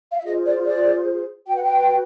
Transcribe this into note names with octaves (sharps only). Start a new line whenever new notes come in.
F5
E5
F4 G#4 C5 D#5
D5
D5
F#4 B4 G5
F#5
G5